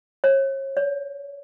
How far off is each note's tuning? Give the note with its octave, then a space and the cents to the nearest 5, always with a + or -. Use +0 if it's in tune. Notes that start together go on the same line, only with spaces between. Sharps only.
C#5 -35
C#5 +35